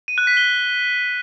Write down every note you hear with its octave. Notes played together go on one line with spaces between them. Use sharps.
D#7
F#6
B6
G7